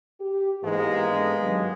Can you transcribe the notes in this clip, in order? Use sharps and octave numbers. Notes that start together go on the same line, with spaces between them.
G4
G#2 E3 G#3 A#3 B3
D4 A4
G2 D#3 F#3